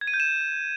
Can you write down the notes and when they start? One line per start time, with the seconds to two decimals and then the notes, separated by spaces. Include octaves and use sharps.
0.01 G#6
0.07 D#7
0.14 G6
0.20 E7